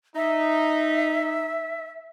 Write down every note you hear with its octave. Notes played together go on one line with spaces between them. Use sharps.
D#4 E5